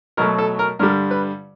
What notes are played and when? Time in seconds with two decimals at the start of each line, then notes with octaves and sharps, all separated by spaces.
0.17 B2 F#3 A3 A#4
0.38 A4
0.59 A#4
0.79 G2 D3 G3 A#4
1.11 B4